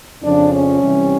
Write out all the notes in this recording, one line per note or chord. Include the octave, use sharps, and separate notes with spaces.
F2 C#3 F3 D4
C#4
C3 E3 G3